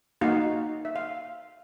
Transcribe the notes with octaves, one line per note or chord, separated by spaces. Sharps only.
A#3 D#4 F#4 F5
E5
F5